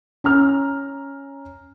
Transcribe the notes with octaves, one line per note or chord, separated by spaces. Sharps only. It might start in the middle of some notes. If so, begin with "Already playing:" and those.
C#4 A#5 F6